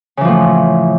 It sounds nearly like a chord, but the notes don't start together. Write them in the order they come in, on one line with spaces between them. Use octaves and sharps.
C#3 E3 F3 A2